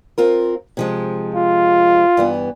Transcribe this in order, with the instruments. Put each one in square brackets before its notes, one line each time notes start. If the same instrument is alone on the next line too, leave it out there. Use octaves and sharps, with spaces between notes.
[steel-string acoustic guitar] C4 F4 A#4
C3 F3 G#3
[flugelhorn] F4
[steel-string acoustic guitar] G2 E3 B3